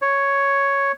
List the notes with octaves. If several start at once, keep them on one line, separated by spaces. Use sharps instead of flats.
C#5